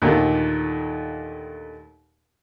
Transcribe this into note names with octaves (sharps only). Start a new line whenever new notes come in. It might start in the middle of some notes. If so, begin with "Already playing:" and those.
D#2 A#2 D3 D#3 A3